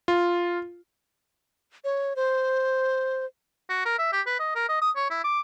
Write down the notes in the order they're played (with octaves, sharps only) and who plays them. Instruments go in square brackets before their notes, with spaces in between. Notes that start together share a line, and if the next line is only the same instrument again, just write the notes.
[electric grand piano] F4
[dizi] C#5
C5
[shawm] F#4
A#4
E5
G4
B4
D#5
A#4
D#5
D#6
C#5
E4
D6